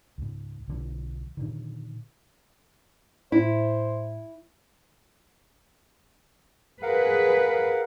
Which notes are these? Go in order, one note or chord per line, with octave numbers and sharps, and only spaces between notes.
C#2 G#2
B1 D3 F3
A#2 D3 D#3
A2 E4 C5
G#4 A#4 B4 F5 F#5